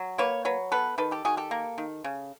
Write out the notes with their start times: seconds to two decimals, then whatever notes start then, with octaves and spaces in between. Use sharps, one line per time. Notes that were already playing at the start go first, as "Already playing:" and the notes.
Already playing: F#3
0.18 A#3 B4 C#5
0.45 F#3 B4 C#5
0.72 B3 A4 B4
0.98 D#3 A4 B4
1.11 G4 A4
1.25 D#3 F#4 G#4
1.37 G4 A4
1.51 A#3
1.78 D#3
2.04 C#3